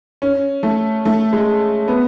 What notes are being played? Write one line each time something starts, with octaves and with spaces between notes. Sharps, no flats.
C#4
A3
A3
G#3
B3